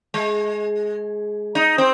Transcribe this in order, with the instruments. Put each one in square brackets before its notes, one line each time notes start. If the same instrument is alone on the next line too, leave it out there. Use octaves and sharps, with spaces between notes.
[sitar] G#3
D#4
C4